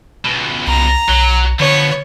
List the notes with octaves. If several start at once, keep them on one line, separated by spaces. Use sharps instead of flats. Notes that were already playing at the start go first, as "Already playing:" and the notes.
C#2 B2
C2 A#5
B1 F#3
D3 F3 B3 C#5